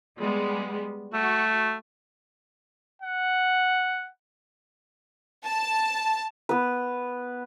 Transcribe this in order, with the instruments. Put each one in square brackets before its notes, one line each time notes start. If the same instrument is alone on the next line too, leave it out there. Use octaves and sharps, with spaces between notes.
[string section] G3 G#3 B3
[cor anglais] A3 [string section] F#4
[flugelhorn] F#5
[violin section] A5
[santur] B3 B4